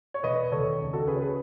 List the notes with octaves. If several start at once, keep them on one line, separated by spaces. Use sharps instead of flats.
C#5
E1 B4 D#5
D#2 A4 C#5
C#2
F#4 A4
C#3 G#4 B4
C#5
G#4 B4